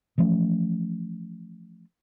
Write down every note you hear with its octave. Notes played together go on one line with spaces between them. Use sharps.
E3 F3 A3 C#4